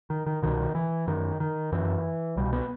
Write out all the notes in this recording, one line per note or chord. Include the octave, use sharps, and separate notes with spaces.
D#3
D#3
C2 B2 D#3
E3
F#2 D#3
D#3
F#2 E3
C2 B2 G3
B3